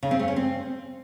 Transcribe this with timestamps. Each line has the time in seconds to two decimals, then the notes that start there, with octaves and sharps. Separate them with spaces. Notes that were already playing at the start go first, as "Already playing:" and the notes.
0.03 C#3
0.11 C4
0.19 A3
0.28 C#4
0.36 C4